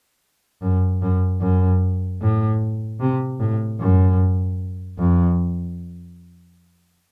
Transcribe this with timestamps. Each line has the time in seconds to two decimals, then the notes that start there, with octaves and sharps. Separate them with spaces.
0.62 F#2
1.02 F#2
1.41 F#2
2.22 A2
3.00 C3
3.40 A2
3.80 F#2
4.99 F2